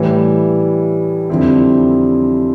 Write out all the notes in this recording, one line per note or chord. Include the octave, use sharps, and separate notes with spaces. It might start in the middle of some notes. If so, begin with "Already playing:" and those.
Already playing: A2 E3 G3
F2 D3 G3 C4 E4